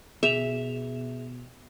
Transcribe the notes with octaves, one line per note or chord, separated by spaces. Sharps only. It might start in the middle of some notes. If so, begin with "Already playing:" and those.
B2 G#4 E5 E7 F7